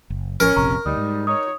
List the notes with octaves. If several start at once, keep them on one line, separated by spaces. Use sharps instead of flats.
F#1
A1 F3 C#4 A#4
F1 A#1 C3 A#5 C#6
D2 G3 D#4 D#6
G#2
D#4 C#5 D#6